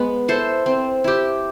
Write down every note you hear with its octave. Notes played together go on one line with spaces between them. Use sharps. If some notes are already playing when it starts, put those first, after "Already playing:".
Already playing: G#3 B3
E4 A4 C5
C4
E4 G4